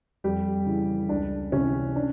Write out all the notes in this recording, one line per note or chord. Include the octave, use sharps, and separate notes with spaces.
F2 G3 G4
C#3 E3
C#2 D4
C3 E3 C#4
D4